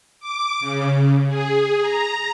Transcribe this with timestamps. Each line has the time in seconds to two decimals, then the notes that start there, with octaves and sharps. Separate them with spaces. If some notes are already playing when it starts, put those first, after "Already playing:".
0.20 D6
0.60 C#3
1.28 G#4
1.82 A#5